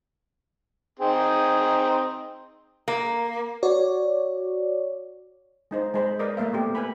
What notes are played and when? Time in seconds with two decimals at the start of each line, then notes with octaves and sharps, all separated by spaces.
0.99 C4 D#4 G#4
2.88 A#3
3.63 F#4 C#5 D5
5.71 G#3 D#4 C5
5.94 G#3 C5 B5
6.19 A#4 B4 D5 D#5
6.37 A3 A#3 E5 F5
6.53 A3 B3 G4
6.75 B4 G#5 B5